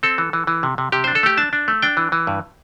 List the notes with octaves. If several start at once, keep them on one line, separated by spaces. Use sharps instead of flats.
C4 A4
E3
E3
E3
C3
C3
C3 G4
D4 C5
A4
A3 G4
D4 A5
D4
A3
D4 G5
E3
E3
G2